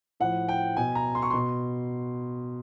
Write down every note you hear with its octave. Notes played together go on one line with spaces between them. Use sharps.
A2 F3 F#5
G5
B2 G#5
A#5
C6
C#6
B2 C6